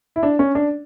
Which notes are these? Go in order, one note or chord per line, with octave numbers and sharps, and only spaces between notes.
E4
D4
C#4
D4